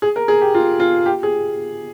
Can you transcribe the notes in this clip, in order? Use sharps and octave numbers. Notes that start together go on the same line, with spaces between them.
G#4
A#4
G#4
G4
F4
F4
G4
G#4